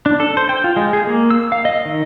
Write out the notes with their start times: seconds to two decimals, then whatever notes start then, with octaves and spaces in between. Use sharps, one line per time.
0.06 D4
0.20 A4
0.37 C5
0.49 G5
0.64 F4
0.77 G#3
0.93 G#4
1.07 A#3
1.30 E6
1.52 F5
1.65 D#5
1.85 D#3